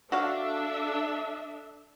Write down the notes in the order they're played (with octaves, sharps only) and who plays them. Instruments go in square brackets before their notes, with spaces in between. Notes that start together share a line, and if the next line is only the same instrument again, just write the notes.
[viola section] D4 A4 E5 [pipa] F#4 C#5 F5